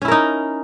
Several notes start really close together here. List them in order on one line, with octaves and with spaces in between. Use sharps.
C#4 E4 A#4 D#4